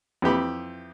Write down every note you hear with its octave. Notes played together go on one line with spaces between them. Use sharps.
F2 E3 G4 B5